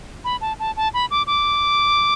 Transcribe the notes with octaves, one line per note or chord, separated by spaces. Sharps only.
B5
A5
A5
A5
B5
D6
D6